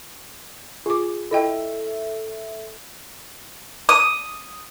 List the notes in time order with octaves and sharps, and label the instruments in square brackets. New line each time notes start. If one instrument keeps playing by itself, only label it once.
[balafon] F4 D6 [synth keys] G#4
[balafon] E4 D#5 G5 [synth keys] A4 E5
[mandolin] D#6